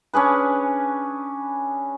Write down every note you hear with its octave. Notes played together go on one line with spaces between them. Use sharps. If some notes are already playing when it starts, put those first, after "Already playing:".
C#4 D4 G#4 B4